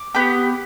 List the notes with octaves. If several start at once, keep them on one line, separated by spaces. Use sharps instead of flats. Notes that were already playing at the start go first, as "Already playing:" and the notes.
Already playing: D6
B3 G4